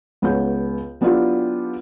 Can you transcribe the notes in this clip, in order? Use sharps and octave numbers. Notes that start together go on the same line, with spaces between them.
C#2 B3 C#5 G6
F#3 B3 D4 E4 F4 G4